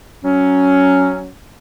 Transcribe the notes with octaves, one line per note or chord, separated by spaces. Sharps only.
F#3 C#4